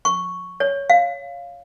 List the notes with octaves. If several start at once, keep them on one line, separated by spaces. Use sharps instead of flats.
C#6
C#5
F5